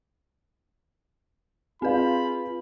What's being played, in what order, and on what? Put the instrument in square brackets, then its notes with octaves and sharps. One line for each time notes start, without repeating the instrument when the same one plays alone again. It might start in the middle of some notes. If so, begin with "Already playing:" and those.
[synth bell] C4 B4 [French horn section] F4 [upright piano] G#4 F5 [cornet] B5